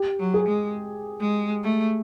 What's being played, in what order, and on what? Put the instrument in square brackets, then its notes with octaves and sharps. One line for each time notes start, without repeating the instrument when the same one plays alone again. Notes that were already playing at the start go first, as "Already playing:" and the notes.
Already playing: [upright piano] G4
[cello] F#3
[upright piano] G#4
[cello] G#3
G#3
A3